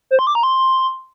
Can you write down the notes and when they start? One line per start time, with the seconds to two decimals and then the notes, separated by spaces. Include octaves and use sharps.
0.11 C5
0.19 C6
0.27 D6
0.35 A#5
0.43 C6